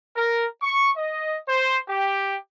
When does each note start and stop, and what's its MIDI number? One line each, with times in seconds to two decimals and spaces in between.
0.16 0.46 70
0.61 0.90 85
0.97 1.36 75
1.47 1.78 72
1.89 2.34 67